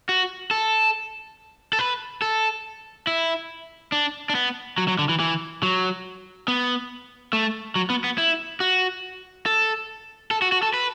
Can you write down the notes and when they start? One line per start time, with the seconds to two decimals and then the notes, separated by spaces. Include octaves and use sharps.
0.09 F#4
0.51 A4
1.73 A4
1.79 B4
2.22 A4
3.07 E4
3.92 D4
4.29 D4
4.35 B3
4.78 F#3
4.88 F#3
4.99 D3
5.09 E3
5.20 E3
5.63 F#3
6.48 B3
7.33 A3
7.76 F#3
7.90 B3
8.04 B3
8.18 E4
8.60 F#4
9.46 A4
10.31 A4
10.42 F#4
10.52 F#4
10.63 A4
10.74 B4